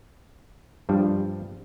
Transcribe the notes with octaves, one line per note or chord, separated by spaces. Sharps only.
G2 F3 G3 D4